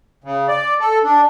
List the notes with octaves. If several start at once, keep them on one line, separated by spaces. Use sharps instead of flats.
C#3
D5
A4
D4